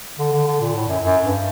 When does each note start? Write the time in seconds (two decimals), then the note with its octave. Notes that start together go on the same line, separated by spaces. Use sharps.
0.19 D3
0.33 D3
0.47 D3
0.61 A#2
0.75 A2
0.89 F#2
1.03 F#2
1.25 G2